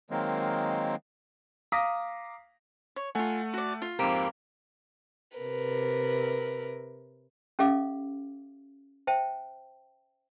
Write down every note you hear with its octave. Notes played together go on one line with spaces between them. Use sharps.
D#3 F#3 G#3 A#3 C4
F5 A#5 D6 D#6 A#6 B6
C#5
A3 F4 F#5 G#5
F#4 D5
F4
F2 G#2 A#3 C4 G4
C3 A#4 B4
C#4 G4 A4 E5 F5 D6
C5 E5 G5 A5